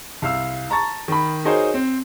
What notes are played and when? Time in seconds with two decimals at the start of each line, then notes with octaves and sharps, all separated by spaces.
0.22 C2 F5 E6
0.70 A5 A#5 C#6 A6
1.08 D#3 B5
1.45 D#4 F#4 G#4 A#4 C5 C#5
1.74 C4